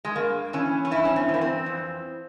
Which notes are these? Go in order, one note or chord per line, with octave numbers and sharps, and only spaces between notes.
G#3
G2 A#3
E3 C#4
C#4
G2 E4
C#4
C4
E3
A#3
C4
F2